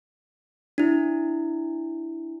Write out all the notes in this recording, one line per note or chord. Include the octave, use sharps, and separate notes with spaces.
D4 E4